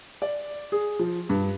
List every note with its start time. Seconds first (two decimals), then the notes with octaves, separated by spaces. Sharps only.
0.22 D5
0.72 G#4
0.99 F3
1.29 G2